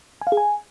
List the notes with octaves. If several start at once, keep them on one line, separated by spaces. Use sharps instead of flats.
G#5
F5
G#4
G#5